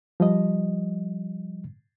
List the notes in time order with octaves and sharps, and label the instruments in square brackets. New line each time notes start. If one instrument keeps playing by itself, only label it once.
[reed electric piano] F3 G3 D#5